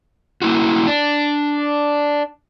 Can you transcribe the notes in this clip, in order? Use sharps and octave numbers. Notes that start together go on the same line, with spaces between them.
A#3 E4 F#4
D4